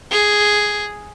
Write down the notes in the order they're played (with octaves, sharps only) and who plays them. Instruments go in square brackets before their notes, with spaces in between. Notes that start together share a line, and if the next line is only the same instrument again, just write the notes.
[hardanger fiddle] G#4